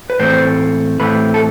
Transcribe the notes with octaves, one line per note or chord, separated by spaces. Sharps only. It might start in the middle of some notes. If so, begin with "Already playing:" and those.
B4
A2 E3 A3 C4 C5
A2 E3 A3 C4 B4
A4